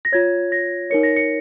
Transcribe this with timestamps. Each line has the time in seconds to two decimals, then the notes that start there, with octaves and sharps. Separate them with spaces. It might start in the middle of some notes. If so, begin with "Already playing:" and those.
0.05 A#6
0.12 F4 C#5 G#6
0.52 A#6
0.90 D#4 A#4 C#5 C#7
1.03 A#6
1.16 C#7